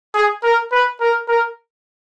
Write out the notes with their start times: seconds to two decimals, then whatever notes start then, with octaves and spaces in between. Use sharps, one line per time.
0.14 G#4
0.43 A#4
0.72 B4
1.00 A#4
1.28 A#4